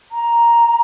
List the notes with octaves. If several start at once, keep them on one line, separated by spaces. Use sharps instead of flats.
A#5